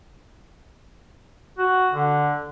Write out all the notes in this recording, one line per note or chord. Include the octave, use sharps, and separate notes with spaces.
F#4
D3